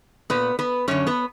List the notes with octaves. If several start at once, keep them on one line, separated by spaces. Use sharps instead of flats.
A#2 B3 B4
B3 B4
F#2 D3 C#4 C#5
B3 B4